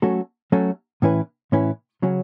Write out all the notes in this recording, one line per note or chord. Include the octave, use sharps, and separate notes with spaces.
F#3 A3 C#4 F#4 A4
F#3 A3 C#4 F#4 A4
A2 E3 C#4 E4 B4
A2 E3 C#4 E4 B4
C#3 F#3 C#4 F#4